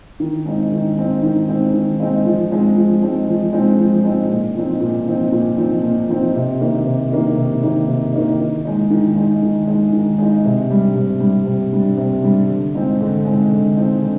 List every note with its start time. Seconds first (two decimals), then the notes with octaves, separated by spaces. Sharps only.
0.20 D#3
0.45 G#3 C4 D#4
0.71 D#3
0.97 G#3 C4 D#4
1.23 D#3
1.48 G#3 C4 D#4
1.74 D#3
2.00 G#3 C4 D#4
2.25 F3
2.51 G#3 C4 D#4
2.76 F3
3.02 G#3 C4 D#4
3.28 F3
3.53 G#3 C4 D#4
3.79 F3
4.04 G#3 C4 D#4
4.30 A#2
4.55 F3 C4 D#4
4.80 A#2
5.06 F3 C4 D#4
5.32 A#2
5.58 F3 C4 D#4
5.83 A#2
6.08 F3 C4 D#4
6.35 C3
6.61 D#3 A#3 D#4
6.86 C3
7.11 D#3 A#3 D#4
7.36 C3
7.63 D#3 A#3 D#4
7.88 C3
8.13 D#3 A#3 D#4
8.40 D#3
8.65 G#3 D#4
8.90 D#3
9.15 G#3 D#4
9.42 D#3
9.67 G#3 D#4
9.93 D#3
10.18 G#3 D#4
10.45 C3
10.70 G3 D4
10.95 C3
11.20 G3 D4
11.46 C3
11.72 G3 D4
11.97 C3
12.24 G3 D4
12.49 D3
12.75 G#3 C4 D#4
13.01 D3
13.25 G#3 C4 D#4
13.51 D3
13.77 G#3 C4 D#4
14.02 D3